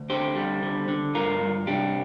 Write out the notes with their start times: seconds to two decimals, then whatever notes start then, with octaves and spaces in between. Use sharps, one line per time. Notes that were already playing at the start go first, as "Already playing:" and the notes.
Already playing: D2
0.10 D3 G4 C5
0.36 G3
0.63 D3
0.88 D3
1.15 G2 F4 A#4
1.41 G2
1.67 C2 D4 G4